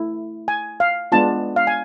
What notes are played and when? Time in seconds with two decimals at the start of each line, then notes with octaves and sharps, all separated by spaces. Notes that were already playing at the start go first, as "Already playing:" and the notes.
Already playing: A3 E4
0.48 G#5
0.80 F5
1.12 G#3 B3 D4 F4 A5
1.56 F5
1.67 G#5